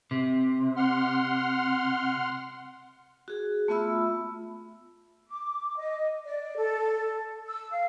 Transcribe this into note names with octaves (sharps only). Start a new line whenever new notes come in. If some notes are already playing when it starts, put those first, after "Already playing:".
C3
F#5 C6 F6
F#4 G#4
A3 B3 F4 E5 B5 E6
D6
D#5
D5
A4
E6
F5